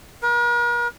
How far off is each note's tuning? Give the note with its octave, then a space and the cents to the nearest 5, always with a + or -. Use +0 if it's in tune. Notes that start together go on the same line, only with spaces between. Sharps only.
A#4 +45